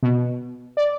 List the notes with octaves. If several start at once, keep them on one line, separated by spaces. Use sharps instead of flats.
B2
D5